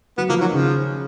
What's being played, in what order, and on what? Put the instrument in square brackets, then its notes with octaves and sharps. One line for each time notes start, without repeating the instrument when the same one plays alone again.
[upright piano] F#3 [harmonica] B3
[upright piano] F3 [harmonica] A#3
[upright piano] D#3 [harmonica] F#3
[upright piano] C#3 [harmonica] F3